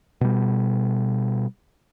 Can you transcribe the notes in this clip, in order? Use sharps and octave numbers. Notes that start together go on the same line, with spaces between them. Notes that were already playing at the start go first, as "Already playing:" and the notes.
B2 G3